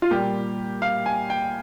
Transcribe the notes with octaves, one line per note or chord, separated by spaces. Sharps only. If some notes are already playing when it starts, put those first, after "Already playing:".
F4
A#2 G3 A#3 G4
F5
G#5
G5